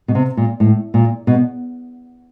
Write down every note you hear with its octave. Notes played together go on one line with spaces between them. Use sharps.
B2
C3
A#2
A2
A#2
B2